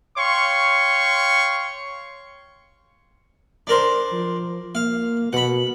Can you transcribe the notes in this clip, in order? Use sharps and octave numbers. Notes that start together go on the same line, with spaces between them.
C#5 F5 G5 C6 C#6
D4 A#4 C5
F3
A#3 F5
B2 F#5 B5